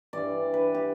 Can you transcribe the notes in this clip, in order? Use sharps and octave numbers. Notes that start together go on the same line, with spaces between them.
G2 E3 G3 D5
B4
G4